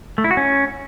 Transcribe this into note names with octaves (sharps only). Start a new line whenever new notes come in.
A3
E4
F#4
C#4